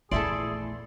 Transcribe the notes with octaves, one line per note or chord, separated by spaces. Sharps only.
A#1 E2 A3 E4 G#4 A4 D5 C6